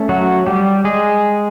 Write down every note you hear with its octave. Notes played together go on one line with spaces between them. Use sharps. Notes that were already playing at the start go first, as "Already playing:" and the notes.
Already playing: A3 C#4
F#3 F#4
G3 G4
G#3 G#4